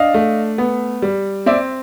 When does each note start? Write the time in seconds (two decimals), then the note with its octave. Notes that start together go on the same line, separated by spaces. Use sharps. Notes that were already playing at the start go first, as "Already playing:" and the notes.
Already playing: D4 D#5 F5
0.14 A3
0.58 B3
1.02 G3
1.46 C4 D5 E5